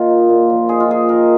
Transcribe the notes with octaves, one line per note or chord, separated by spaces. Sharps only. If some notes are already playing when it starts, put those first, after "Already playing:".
Already playing: D#3 A#3 F4
D#4
A#2
F3
D#4 G#4
F4
A#3 G#4
D#3 A#4